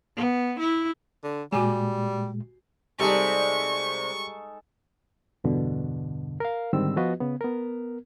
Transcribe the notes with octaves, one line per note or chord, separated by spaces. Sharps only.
B3
E4
D3
A#2 G3 G#3 F#4 G4 G#5
C3 G3 G#3 D#4 A4 D5 C#6
E2 G2 B2 D3
A#4 F5
G#2 D3 D#3 G3 C4 E6
F3 B3 F4 F#4 B4 D#5
C#3 B3
B3 A#4